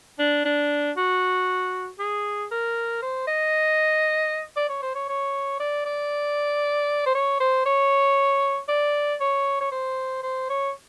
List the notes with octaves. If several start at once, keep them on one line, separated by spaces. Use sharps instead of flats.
D4
D4
F#4
G#4
A#4
C5
D#5
D5
C#5
C5
C#5
C#5
D5
D5
C5
C#5
C5
C#5
D5
C#5
C#5
C5
C5
C#5